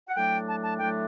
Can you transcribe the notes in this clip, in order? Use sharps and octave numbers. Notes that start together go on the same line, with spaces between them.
F#5
A2 F#3 A3 D4 G5
A5
A5
A2 F#3 A3 D4 G5